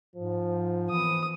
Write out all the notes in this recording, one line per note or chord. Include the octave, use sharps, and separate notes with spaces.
G#2 F3
E3 D#6